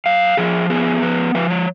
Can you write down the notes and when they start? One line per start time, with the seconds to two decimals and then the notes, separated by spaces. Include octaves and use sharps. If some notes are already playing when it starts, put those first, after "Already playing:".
0.06 F#2 F5
0.37 F3 G#4
0.70 B3 G#4
1.02 F3 B4
1.34 F3 B4
1.50 C#5